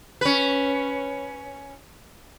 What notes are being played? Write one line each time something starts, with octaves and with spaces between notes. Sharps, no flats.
C#4 B4